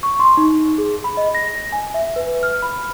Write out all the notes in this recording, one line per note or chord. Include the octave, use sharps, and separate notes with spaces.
C#6
C6
D#4
G#4
B5
D#5
A#6
G#5
E5
B4
F6
B5